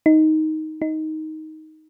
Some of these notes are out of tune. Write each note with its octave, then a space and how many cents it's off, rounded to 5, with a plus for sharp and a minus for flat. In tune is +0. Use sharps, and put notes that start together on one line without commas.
D#4 +10
D#4 +10